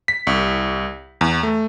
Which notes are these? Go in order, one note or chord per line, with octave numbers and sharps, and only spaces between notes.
B6
C2
E2
A3